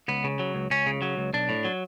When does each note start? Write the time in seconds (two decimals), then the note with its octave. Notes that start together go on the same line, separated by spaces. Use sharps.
0.08 C#2 B3
0.24 C#3
0.39 F#3
0.55 C#2
0.70 C#2 C#4
0.87 C#3
1.02 F#3
1.17 C#2
1.33 B1 D4
1.49 A2
1.65 F#3